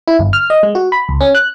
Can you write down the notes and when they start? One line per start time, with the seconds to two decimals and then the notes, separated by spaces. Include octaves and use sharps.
0.08 E4
0.19 G1
0.33 F6
0.50 D#5
0.63 G#3
0.75 F#4
0.92 B5
1.09 C#2
1.21 C#4
1.35 F#6